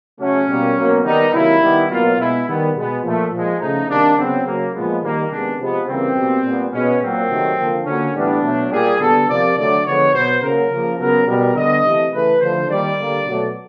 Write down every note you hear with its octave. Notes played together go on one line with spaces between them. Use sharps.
C#3 F#3 A3 C#4
B2 G3 A#3
B2 F#3 A#3
D#3 G3 B3 D#4
C3 D#3 F#3 A#3 E4
D#3 G3 B3
B2 F#3 A#3 F4
B2 G#3 B3 E4
D#3 G3 B3
B2 G#3 B3
A#2 F3 A3
A#2 F3 G#3
C#3 F3 A3 D#4
C3 D#3 G3 A#3 D4
C#3 F#3 B3 C4
C#3 F#3 A#3
A#2 F3 G#3 B3
D#3 G3 A#3
C3 D#3 G#3 B3 D4
C3 F3 G#3 B3
C#3 E3 G3 A#3 C4
B2 G3 A#3
A#2 G3 B3
B2 G#3 B3 C#4
A#2 F#3 A#3 C4
C3 D#3 F#3 A3
D3 F3 A#3
D3 F#3 A#3 C#4
A2 E3 G3 B3 D4
B2 F#3 A3
A#2 G3 A#3 G#4
D3 G3 B3 A4
C3 F3 A#3 D5
D3 F#3 A3 D5
D3 F3 G#3 B3 C#5
B2 F#3 B3 C5
C#3 F#3 A#3 A#4
C#3 F3 A#3
C#3 F#3 B3 A#4
B2 G3 B3 A#4
D3 G3 B3 D#5
C3 E3 A3
C#3 E3 A3 B4
D3 F3 A3 C5
D#3 G3 A#3 D5
D3 G3 A#3
B2 F#3 A3